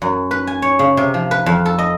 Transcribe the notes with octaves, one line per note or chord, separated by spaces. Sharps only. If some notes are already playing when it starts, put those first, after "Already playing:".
F#2
B4
G#5
C#5
C#3
C3
F3
B4
F2
A4
D#5